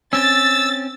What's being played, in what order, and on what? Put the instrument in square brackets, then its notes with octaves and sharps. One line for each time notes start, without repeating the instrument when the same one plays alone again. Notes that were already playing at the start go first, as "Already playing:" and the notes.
[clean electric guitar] C4 C#4 [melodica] E6 [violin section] A6